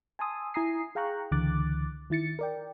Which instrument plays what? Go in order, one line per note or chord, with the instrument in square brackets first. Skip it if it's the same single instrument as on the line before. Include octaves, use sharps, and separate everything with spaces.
[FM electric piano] G#5 A5 C6 D#6 E6
E4 G#5 A#5 D#6 C7
G#4 F5 G5 A#5 C#6 F#6
C#2 D3 E3 D6 F#6 A6
D#3 E4 A6 C#7
A#4 D5 G5